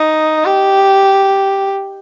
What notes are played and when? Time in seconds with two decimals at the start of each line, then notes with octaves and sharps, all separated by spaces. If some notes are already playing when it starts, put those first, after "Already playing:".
Already playing: D#4
0.45 G4